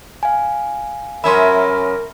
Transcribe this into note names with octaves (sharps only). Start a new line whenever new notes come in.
F5 G#5
F#2 C#4 A#4 E5 B5 C6